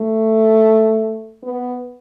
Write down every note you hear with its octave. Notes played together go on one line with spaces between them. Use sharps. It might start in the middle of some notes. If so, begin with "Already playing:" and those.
Already playing: A3
B3